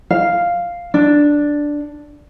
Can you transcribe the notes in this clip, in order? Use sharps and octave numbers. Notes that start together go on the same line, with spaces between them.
F5
D4